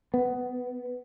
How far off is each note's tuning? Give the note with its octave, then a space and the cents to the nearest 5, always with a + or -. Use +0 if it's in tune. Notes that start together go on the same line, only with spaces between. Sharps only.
B3 +15